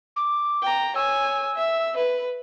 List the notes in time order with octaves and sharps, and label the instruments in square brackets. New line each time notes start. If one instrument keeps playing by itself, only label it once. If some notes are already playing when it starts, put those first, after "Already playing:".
[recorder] D6
[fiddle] G5 A#5
[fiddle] C#5 G#5 [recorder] E6
[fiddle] E5
B4